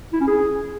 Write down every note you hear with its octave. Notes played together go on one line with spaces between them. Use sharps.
E4
C#4
G#4